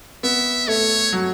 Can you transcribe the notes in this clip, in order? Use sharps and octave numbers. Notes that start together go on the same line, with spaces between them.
B3 E5
A3 C#5
F#3